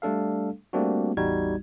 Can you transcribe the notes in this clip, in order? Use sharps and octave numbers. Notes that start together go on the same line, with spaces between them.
G3 A3 D4 A4 F5
G3 A3 A#3 C4 D4 F#4
A1 E2 G3 D#4 F#4 G#6